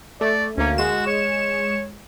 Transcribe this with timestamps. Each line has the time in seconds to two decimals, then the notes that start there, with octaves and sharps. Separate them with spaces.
0.21 A3 D5
0.57 D2 A#3 C#4
0.78 G#3 F#4 E7
1.07 C#5